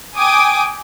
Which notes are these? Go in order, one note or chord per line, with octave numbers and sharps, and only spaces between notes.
G5 G#5 D6 D#6